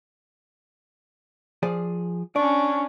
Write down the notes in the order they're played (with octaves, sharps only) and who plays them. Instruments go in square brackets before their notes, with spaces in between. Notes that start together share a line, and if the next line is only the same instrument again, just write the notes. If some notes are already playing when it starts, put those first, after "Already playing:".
[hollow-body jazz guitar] F3 G#4 D5
[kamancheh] C#4 D4 [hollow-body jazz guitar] D5 [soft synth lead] C#6